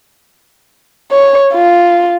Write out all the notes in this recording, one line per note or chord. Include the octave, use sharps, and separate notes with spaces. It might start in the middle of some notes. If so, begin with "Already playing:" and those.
C#5
F4